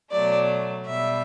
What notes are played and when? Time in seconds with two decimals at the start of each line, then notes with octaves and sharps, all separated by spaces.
0.12 B2 F#3 A3 D5
0.87 B2 G3 E5